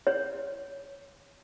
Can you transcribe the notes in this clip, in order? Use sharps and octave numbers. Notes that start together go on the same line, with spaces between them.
C#5